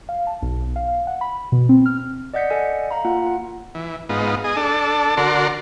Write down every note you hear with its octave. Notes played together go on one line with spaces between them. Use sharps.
F5
A5
B1
F5
F#5
B5
B2
C4
F6
D5 D#5 F#5 G6 B6 C#7
A4 D5 D#5 F#5 G#5
F5 A#5 B5
A#3 F4 F#5
F4 F#5
E3
G#2 B3 D#4 F4
G#4 D#5
D4 A4
D3 F#4 A#4 D5 C6